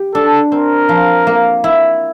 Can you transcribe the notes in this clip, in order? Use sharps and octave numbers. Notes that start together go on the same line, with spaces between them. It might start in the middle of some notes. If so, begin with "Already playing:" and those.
Already playing: G4
D4 A4
C4 A#4
F3
A#3
E4